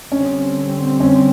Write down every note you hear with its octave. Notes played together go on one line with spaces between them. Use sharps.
D3 G3 C4 C#4
C#4